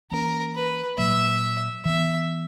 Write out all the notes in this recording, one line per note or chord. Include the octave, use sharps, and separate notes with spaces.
E3 A#3 C#4 A#4
B4
A#2 F#3 A#3 E5
E3 B3 E5